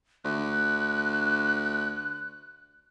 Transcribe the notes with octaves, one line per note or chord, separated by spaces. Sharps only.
D2 F#6